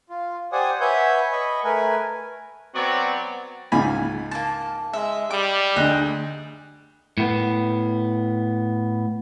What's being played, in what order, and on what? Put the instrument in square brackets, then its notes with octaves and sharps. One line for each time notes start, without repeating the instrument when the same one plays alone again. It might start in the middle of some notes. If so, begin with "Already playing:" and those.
[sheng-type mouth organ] F4
G4 C5 D5 F#5 G#5 D#6
B4 C#5 E5 F#5 G#5 G6
D#5 B5 C#6
A3 A#4 B4 G#5
[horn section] F#3 B3 C4 F#4 C#5 D5
[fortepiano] C#2 G#2 B5 [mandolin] G#5
[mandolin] A#3 A5
[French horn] G#3 [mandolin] E5
[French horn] G3 [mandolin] D6
[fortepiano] D2 [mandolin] D#4 G#4 F#5
[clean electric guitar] A2 B3